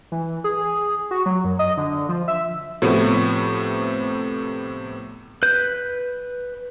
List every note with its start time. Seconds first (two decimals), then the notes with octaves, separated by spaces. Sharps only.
0.12 E3
0.44 G#4
1.11 F#4
1.26 F#3
1.45 F#2
1.59 D#5
1.77 D3
2.09 F3
2.28 E5
2.82 A2 C3 F3 A3 B3
5.43 B4 G6